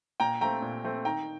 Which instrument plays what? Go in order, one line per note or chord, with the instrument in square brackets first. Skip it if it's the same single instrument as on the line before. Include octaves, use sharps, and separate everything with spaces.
[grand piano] A#2 G5 A#5
A3 C4 G5 A#5
A#2
A3 C4
D#3 G5 A#5